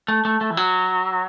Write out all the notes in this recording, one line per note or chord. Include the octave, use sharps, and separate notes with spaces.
A3
A3
A3
E3
F#3